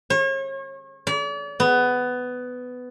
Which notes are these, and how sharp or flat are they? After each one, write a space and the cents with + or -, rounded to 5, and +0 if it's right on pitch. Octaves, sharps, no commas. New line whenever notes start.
C#5 -40
D5 -40
B3 +15